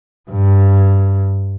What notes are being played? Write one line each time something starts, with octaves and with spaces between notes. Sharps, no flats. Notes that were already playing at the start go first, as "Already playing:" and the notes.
G2